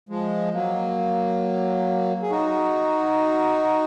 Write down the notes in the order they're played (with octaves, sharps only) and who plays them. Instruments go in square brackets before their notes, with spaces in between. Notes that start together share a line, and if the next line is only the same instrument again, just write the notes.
[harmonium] F3 G#3
F#3 A#3
G#4
D#4 F#4